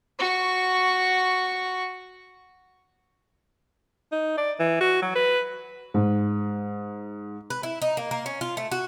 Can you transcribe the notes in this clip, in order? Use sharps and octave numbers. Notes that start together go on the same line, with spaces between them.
F#4 C#6
D#4
D5
E3
F#4
F#3
B4
G#2
B4
E4
D#4
A#3
A#3
C#4
F4
A3
F#4